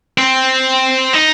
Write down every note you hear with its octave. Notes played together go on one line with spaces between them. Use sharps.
C4
D#4